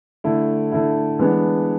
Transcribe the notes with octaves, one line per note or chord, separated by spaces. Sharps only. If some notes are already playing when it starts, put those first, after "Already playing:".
D3 A3 E4
D3 A3 E4
E3 G#3 B3 D4